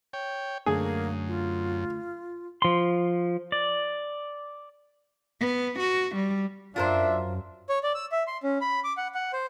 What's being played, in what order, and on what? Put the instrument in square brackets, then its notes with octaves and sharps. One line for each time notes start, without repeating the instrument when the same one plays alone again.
[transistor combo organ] C#5 G5
[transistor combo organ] F#2 [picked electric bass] D3 A3 D4 [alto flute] A#3 [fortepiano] G#4
[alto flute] F4
[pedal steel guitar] F3 C6
D5
[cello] B3
F#4
G3
[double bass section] F#2 [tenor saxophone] D4 [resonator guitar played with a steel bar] F4 A#4 C5 [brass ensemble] E5
[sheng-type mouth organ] C#5
D5
E6
E5
C6
C#4
B5
D6
F#5
F#5
C5